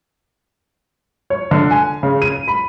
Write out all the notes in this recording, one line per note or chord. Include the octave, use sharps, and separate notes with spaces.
C#5
D3
G#5
C#3
D#7
B5